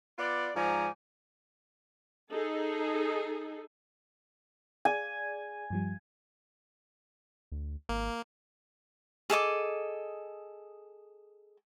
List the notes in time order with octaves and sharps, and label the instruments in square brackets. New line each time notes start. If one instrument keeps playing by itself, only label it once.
[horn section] B3 F4 D5
G#2 F3 D5 G#5 A#5
[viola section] D#4 G#4 A4
[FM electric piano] G#4 D5 [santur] G#5
[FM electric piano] G2 F3 G3
[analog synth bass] D2
[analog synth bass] G#1 [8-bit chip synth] A#3
[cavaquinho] G#4 A4 D#5 D6